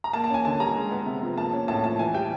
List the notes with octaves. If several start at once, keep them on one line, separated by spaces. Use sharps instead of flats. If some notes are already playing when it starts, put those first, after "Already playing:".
A#5
A#3 A5
A5
C#4 G#5
D3 A5
G3 A#5
G#3
B3
C3
F3
A#3 A5
C#4
A2 A5
F3 A5
E3 G#5
G3 G5